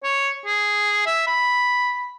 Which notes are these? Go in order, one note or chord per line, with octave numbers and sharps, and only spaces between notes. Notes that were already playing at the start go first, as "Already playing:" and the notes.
C#5
G#4
E5
B5